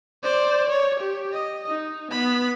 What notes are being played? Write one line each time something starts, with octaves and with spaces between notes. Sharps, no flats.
C5 D5
C#5
G4
D#5
D#4
B3 B5